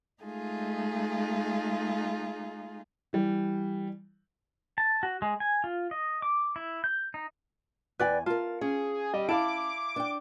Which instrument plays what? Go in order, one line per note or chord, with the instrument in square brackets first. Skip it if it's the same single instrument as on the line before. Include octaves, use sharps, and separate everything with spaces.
[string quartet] G#3 A3 D#4 F4 G#4
[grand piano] E3 G3
[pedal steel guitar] A5
F#4
G#3
G#5
F4
D#5
D6
E4
G6
D#4
[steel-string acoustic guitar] E2 G#5 [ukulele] B4 D5 G5
[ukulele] F4 [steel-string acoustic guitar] A#4 A5
[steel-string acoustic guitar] C#4 [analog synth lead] G#4
[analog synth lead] G3 [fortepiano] D#5
[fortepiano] E4 F5 [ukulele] A5 [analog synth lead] D6
[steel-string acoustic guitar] D4 G5